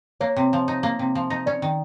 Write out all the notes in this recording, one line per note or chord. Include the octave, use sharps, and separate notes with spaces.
A#3 C#5
C3
F3
D#4
A#3
C3
F3
D#4
C#4 D5
D#3